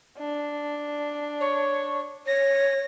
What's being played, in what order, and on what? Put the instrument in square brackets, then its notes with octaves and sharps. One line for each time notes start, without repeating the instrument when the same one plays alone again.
[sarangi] D4
[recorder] C#5
[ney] C#5 [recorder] A#6